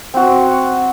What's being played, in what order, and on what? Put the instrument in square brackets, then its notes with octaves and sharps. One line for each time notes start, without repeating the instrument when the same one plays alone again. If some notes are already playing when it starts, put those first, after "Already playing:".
[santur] C4 F#4